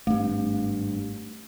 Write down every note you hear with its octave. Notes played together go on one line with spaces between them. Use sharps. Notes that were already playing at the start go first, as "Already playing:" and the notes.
G#1 G2 A3